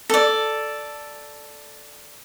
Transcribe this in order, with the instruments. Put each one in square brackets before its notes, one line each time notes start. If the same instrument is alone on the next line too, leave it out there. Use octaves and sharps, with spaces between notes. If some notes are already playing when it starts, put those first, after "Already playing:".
[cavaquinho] A4 D5